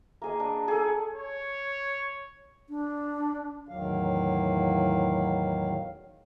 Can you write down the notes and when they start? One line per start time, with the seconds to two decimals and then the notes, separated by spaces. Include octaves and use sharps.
0.22 A#3 G#4 D#5
0.40 D4
0.68 G#4 A4
1.14 C#5
2.70 D4
3.69 E2 A2 D#3 F#3 F5